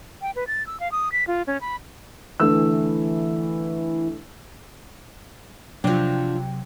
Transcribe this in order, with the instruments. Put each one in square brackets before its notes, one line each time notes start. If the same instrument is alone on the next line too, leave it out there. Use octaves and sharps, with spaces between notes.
[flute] G5
B4
A6
E6
F5
D#6
B6
F4
C#4
B5
[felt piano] D3 A3 E6 [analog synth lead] E3
[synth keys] C3 F#3 G5 [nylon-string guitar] F3 D4